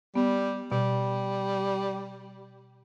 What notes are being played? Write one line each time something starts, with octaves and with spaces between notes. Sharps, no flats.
G3 B3
B2 G3